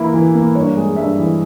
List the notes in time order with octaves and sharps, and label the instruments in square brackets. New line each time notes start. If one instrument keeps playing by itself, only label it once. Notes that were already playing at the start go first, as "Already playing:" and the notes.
Already playing: [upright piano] E3 A#3 E4
E3
A#3
G2 C#5
G#3
G2 E5
E3